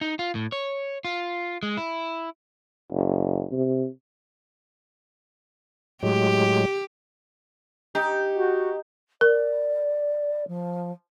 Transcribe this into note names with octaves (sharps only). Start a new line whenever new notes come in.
D#4
F4
A2
C#5
F4
G#3
E4
F#1
C3
A2 F#3 G#3 G4
D#4 G4
F#4
A#4 D5
F3